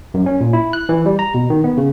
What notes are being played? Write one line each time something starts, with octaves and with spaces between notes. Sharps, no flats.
F#2
C#4
A#2
E4
F#6
E3
G3
A#5
B2
D#3
B3
C#3